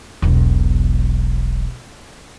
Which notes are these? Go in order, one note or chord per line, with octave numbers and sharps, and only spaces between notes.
E1 B1